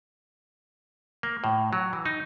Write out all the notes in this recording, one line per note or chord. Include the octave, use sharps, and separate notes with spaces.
A#3
A2
F#3
E3
D#4